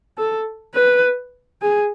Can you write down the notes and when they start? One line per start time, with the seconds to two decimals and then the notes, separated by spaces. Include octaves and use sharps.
0.18 A4
0.75 B4
1.62 G#4